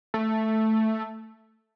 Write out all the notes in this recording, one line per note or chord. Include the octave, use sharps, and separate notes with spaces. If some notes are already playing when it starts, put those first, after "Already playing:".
A3